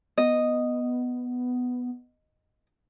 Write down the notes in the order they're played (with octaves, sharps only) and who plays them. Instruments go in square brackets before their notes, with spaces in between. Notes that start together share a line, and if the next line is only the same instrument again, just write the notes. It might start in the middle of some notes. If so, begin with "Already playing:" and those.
[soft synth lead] B3 [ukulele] D#5